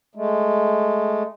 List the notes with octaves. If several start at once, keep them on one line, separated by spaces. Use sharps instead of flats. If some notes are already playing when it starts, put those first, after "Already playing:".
G#3 A3